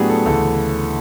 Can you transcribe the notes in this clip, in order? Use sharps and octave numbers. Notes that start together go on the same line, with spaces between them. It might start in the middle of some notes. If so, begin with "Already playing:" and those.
Already playing: A2 F#3 B3 D4 G4 G#4
A4
D2 C#3 E3 A4